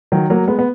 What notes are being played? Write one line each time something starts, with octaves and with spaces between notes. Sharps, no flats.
D#3 F#3
F#3 A#3
G#3 B3
B3